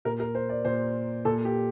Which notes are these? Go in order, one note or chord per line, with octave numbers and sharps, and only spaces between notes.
A#2 A#4
A#4
C5
D5
A#2 C5
A#2 A4
G4